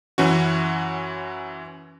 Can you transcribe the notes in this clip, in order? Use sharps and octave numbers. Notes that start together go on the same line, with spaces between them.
F#2 E3 C#4 F#4